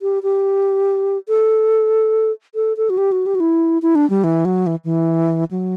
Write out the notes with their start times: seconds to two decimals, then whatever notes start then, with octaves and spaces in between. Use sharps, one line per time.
0.02 G4
0.23 G4
1.29 A4
2.55 A4
2.77 A4
2.90 F#4
2.98 G4
3.12 F#4
3.26 G4
3.35 F#4
3.40 E4
3.82 E4
3.95 D4
4.10 G3
4.24 E3
4.45 F#3
4.67 E3
4.85 E3
5.51 F#3